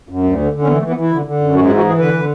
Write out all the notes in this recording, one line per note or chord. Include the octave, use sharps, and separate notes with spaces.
F#2
D2
D3
D3
C#4
E3 B3
A3
E3
B3
E3 E4
D3
D3
F#2
G#2 F#4
F#4
E3
F#4
E3 G#4
D3 B4
D3